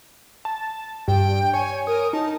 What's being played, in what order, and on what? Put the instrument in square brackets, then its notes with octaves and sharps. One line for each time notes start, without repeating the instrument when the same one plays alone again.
[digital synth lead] A5
[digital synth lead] G2 [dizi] G5
[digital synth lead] C#5 [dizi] G#5
[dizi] A#4 [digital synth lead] D#6
[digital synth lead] D#4 [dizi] A5